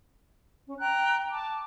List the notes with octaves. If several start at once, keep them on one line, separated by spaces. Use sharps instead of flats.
C#4
G5 A#5 F#6
A5 D6